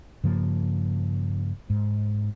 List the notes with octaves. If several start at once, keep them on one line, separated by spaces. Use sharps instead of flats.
G2 C#3 F3 A#3
G#2